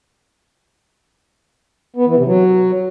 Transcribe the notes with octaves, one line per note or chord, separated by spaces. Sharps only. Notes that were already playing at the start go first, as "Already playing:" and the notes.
B3
E3
C3
F#3